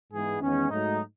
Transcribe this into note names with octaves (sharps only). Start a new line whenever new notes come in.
G#2 E3 G#3 B3 G#4
E2 D#3 G#3 B3 C#4
G#2 F#3 A3 D#4